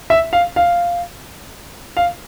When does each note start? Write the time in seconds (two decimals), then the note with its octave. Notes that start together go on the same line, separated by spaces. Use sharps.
0.10 E5
0.33 F5
0.56 F5
1.97 F5